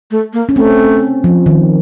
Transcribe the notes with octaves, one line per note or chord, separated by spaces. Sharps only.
A3
A#3
C#4
A3 C4
F3
D#3